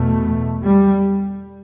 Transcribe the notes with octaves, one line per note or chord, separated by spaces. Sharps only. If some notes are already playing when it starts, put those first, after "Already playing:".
Already playing: E2 B2 A3
G3